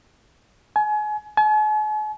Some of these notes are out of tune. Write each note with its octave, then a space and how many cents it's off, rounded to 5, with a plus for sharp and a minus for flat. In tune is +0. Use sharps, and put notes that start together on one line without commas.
G#5 +30
G#5 +45